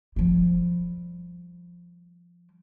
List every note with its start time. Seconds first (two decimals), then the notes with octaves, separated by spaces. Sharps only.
0.16 F3 G3